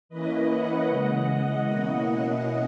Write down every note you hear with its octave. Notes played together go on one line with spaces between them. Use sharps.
E3 A#3 C#4 E4 B4 D#5
D#5 F#5
C#3 E3 G#3
B2 A#3 C#4 E4